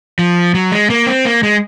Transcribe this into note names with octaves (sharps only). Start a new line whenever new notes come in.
F3
F#3
G#3
A#3
C4
A#3
G#3